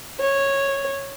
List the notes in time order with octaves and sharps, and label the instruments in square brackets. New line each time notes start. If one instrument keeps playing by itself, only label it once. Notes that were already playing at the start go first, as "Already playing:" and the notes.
[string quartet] C#5